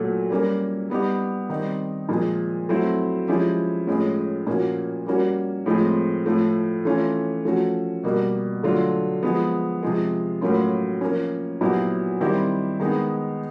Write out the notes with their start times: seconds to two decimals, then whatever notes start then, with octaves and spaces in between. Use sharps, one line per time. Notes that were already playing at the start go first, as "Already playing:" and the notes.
Already playing: A#2 F#3 A3
0.30 G3 A#3 C#4
0.90 G3 B3 D#4 G4
1.49 D#3 G3 C4 D#4
2.09 A#2 F3 G#3
2.69 F#3 A3 C4 E4
3.28 F3 G#3 C#4 E4 G4
3.87 A2 F3 G#3 C#4
4.47 A#2 F3 A#3 C#4 F#4
5.06 G3 A#3 C#4 F#4
5.66 A2 F3 G#3 C4
6.26 A2 F3 A3
6.85 E3 A3 C#4 F4
7.45 F3 A3 C#4 F#4
8.03 B2 G3 A#3
8.63 D3 F#3 A3 D4 F4
9.23 F3 G#3 B3
9.83 C3 F3 G#3
10.41 A2 F#3 A#3 C#4 F4
11.01 F3 A#3 C#4
11.61 A#2 F#3 B3 E4 G4
12.21 D#3 G3 C4 E4 G4
12.80 D#3 G#3 B3 D#4